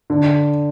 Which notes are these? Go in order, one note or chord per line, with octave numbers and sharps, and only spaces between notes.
D3